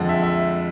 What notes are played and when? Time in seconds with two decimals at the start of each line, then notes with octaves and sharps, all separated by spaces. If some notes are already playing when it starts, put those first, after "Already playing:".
Already playing: F2 D3 F3 G#3
0.09 E5
0.23 E5